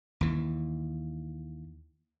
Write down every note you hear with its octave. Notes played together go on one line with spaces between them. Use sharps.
D#2 E3